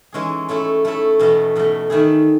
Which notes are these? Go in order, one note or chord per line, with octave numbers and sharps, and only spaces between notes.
E3 G#3 C#4 G#4
A3 C#4 E4 A4
A3 C#4 E4 A4
E2 B2 A3
E2 B2 A3
D#3 A3 E4 G#4